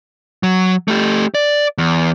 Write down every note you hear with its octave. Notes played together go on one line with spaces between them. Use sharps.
F#3
A3 G4
D5
E2